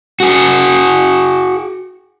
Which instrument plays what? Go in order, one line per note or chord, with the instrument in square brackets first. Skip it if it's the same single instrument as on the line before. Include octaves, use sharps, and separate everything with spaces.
[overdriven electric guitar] F#4 G#4